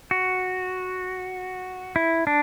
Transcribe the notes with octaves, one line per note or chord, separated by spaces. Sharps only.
F#4
E4
D4